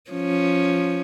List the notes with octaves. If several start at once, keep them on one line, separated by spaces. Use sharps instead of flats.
F3 C#4